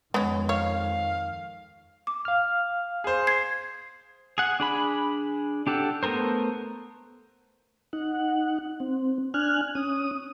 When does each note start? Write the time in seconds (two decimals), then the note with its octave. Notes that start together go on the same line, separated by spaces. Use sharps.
0.14 F2 D#3 G#3 B3 C#4
0.49 C#5 F5
2.07 D6
2.25 F5 F6
3.04 G#4 C5
3.27 G#6 C7
4.38 G#4 F#5
4.60 D4 G#4 B5
5.67 D4 G4 A4 F#5
6.03 A3 B3 A4 A#4 C5
7.93 D#4 F#5
8.80 C4
9.34 D4 G#5 F6 F#6
9.75 C#4 D#6